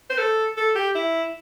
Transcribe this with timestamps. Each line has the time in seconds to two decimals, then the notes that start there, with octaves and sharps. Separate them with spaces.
0.10 C5
0.18 A4
0.57 A4
0.76 G4
0.95 E4